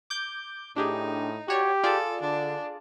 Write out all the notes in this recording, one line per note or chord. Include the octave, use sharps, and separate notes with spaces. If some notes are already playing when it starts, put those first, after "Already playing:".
D6 G6
A2 D4 D#4 G4 G#4
F#4 G4 C#5 D5
F4 G#4 A4 D5
D3 D4